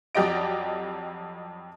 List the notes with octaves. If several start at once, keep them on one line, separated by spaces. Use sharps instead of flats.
F2 F#3 G4 D5 D#5 D7